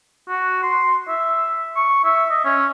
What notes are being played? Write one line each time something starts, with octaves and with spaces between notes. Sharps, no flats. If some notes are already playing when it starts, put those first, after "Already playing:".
F#4
C6
E5
C#6
E5
D#5
C#4